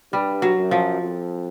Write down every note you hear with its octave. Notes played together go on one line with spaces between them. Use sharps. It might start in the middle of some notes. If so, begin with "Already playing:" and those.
G2 G3
F#3
F#2
F3
F2